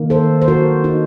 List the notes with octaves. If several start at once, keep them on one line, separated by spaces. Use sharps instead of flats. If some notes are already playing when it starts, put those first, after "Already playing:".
Already playing: D#3 A#3
A4 C5
C5
F#4 A#4
D#4 F#4